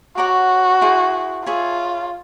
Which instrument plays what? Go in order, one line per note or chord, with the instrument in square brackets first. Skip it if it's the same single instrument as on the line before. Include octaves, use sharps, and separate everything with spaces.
[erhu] F#4 [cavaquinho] C#5 F#5 A#5 D6
[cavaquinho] E4 G#4 C5
[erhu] F4 [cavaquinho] G#4 C#5 E5